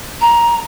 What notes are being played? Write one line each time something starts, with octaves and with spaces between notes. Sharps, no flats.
A#5